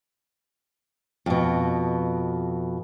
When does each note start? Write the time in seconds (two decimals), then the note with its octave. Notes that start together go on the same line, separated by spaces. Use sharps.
1.26 F2 B2